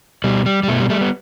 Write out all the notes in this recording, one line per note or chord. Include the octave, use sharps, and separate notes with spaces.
B2 G3
G3
G3
B2 A3
G3
G3 A3
B3